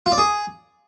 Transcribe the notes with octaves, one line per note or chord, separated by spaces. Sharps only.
F4
D5
G#4